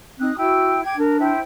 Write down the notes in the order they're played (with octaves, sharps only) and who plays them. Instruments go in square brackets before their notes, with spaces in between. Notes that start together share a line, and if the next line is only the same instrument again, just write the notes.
[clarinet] C4 [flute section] D#4 D#6 F#6
[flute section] E4 G5 E6 [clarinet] F#4
[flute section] G5 D6 G#6
[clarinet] D4 [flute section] A#4
[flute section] E4 C5 G5